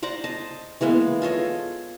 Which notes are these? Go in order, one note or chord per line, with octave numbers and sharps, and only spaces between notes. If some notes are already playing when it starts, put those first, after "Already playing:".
C5 D5 F#5 A#5
D#5 A5
E3 G#3 A#3 B3
F4 A4 C#5 D#5